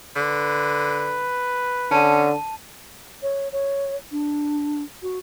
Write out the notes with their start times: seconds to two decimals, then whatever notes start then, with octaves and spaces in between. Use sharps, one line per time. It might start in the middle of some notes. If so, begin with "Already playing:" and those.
0.16 D3 B4
1.91 D3 C#4 A5 D#7
3.22 C#5
3.52 C#5
4.11 D4
5.02 F#4